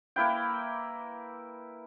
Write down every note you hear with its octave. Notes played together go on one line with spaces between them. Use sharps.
A#3 E4 B4 G5